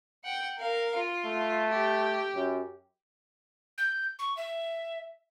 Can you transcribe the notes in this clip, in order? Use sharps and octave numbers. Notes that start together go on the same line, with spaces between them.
F#5 G5
A#4 F5
F4
A3
G4
F#2
G6
C#6
E5